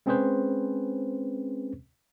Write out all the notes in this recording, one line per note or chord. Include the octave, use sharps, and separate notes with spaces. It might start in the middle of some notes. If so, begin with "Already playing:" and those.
G#3 C4 C#4 G#4 B4 C5